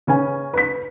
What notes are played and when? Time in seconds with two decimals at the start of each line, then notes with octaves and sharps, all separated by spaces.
0.07 C#3 C#4 B4 G#5
0.54 B4 B6